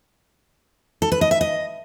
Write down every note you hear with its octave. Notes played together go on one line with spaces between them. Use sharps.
A4
B4
D#5
E5
D#5